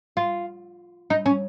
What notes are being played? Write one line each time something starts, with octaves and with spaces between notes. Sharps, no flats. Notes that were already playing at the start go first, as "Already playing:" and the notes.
F4
D#4
C#4